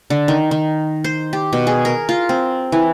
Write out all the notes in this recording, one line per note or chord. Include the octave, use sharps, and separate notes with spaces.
D3
D#3
D#3
C5
G4
B2
G#4
A#4
F4
C4
E3